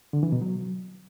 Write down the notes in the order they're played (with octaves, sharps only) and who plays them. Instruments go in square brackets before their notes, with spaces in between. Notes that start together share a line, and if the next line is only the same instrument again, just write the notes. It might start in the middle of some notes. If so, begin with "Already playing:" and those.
[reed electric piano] D3
E3
B2
F#3